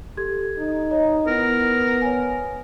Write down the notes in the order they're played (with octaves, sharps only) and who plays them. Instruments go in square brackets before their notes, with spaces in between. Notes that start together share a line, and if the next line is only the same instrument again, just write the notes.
[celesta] G4 A4 G#6
[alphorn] D#4
[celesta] C#5 D#5 A#5
[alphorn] B3 [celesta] E4 [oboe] A#4
[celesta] C#5 G#5